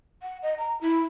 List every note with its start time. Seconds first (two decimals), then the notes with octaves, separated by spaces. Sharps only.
0.22 F#5
0.42 D#5
0.58 A#5
0.81 E4